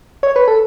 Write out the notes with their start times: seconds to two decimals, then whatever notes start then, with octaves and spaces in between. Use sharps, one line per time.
0.23 C#5
0.36 B4
0.48 A4